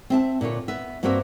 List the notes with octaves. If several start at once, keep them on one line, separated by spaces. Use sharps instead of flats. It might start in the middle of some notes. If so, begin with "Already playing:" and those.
C4 E5 A5
A#2 D3 F4 C#5
B3 E5
G2 A#3 C4 F#4 A#4 E5